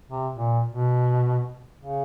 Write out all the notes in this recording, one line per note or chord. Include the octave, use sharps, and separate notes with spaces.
C3
A#2
B2
C#3